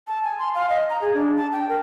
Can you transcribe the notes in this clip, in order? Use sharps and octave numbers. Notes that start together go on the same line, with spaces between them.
A5
G#5
C6
F5
D#5
A#5
G#4
D4
A5
G5
A#4